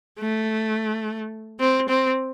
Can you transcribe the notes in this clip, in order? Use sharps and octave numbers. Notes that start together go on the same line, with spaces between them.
A3
C4
C4